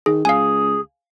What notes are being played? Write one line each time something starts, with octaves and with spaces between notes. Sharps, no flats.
D#3 G#4
C#2 G#4 F5 G#5